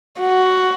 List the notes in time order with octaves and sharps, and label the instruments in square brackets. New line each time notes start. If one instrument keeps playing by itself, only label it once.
[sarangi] F#4